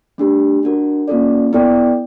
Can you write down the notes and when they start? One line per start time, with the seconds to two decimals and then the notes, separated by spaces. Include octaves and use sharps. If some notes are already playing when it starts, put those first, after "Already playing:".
0.18 A3 D4 G4
0.63 D4 F#4 A#4
1.08 A#3 C#4 F4 A4 D5
1.53 B3 E4 A4 D5 G5